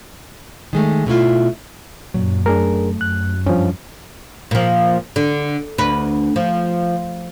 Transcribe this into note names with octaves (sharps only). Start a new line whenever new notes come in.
D#3 G#3 A3
B2 A3 E4 F4
F#2 A#2 F#3
A3 D4 G#4 A#4
F#2 F#6
G2 F3 C#4
A#2 F3
D3
D2 B4
F3